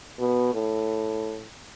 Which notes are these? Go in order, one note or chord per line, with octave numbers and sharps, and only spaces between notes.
B2
A2